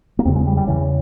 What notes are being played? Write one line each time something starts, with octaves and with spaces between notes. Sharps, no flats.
A#3
E2 C#3 C4
G#3
G3
G3
E2 C#3 E3